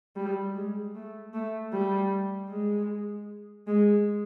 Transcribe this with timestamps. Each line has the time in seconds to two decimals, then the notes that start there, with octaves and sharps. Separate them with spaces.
0.16 G3
0.55 G#3
0.95 A3
1.34 A3
1.73 G3
2.49 G#3
3.67 G#3